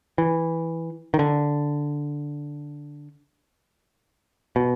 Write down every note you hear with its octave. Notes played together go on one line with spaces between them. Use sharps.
E3
D#3
D3
B2